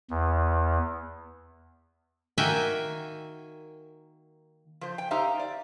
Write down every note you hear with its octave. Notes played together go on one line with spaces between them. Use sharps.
E2
D#3 A#3 F#4 E5 G5 G#5
F3 C5
G5
D#4 G4 C5 E5 F5
D5